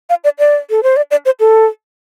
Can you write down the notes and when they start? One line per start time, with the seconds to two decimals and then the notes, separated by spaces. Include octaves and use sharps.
0.10 F5
0.24 D5
0.39 D5
0.70 A4
0.83 C5
0.97 D5
1.11 D5
1.25 C5
1.40 A4